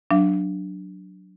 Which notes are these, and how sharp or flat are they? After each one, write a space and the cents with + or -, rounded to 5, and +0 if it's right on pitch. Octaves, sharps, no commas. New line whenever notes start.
F#3 +0 D4 +0 F5 -45